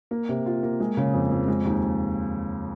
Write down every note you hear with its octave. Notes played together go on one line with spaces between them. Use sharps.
A#3
C3
F4
A#3
G#3
C#3
F2
F2
G#3
D#2